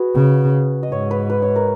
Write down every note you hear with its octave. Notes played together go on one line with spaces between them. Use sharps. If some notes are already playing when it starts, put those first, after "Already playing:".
Already playing: F#4 G#4 B4
C#3
D#5
G#2 C#5
B4
B4
C#5
A#4